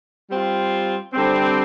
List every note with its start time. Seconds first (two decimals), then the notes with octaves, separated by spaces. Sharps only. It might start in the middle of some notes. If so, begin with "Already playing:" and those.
0.29 G3 C4 F4
1.12 D3 G3 C4